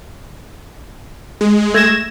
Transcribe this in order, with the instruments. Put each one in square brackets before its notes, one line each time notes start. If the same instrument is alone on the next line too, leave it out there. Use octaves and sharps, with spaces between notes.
[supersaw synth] G#3
[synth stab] A3 A#6 E7 [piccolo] G#6